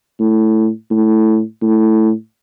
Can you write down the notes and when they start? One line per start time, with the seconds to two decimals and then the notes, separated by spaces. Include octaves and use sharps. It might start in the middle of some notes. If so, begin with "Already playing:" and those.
0.20 A2
0.91 A2
1.62 A2